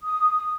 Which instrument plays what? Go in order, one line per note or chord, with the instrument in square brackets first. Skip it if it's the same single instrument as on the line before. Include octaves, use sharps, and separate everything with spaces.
[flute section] D#6